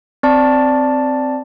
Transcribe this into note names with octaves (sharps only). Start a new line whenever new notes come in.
C4 D5 A5